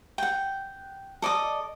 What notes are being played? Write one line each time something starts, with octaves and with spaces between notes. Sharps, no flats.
F#5 G5
A4 D5 D#5 D6